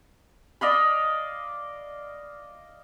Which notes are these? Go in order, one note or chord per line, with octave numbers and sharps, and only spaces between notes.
D5 D#5 F5 B5